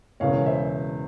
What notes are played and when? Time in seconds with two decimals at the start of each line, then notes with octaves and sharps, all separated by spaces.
0.20 E1 E2 C#3 C#5 F5
0.46 C5 E5